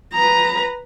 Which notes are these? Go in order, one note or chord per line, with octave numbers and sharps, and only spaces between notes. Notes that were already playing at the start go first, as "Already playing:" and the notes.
B4 A#5